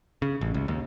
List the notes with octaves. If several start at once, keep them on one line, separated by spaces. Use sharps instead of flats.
C#3
A1
C#2
D#2